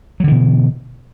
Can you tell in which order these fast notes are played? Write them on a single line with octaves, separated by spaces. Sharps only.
F#3 D3 E3 B2